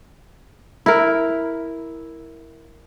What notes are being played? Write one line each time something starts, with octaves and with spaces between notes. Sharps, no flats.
E4 A#4